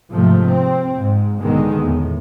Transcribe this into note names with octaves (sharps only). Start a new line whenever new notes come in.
G#2 C3 F3 A3
C4
G#2
B1 D3 D#3 G#3 B3
E2 A2